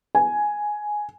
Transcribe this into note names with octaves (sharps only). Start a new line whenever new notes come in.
G#5